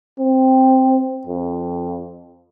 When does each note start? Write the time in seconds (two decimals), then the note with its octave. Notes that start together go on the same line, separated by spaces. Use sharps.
0.19 C4
1.27 F2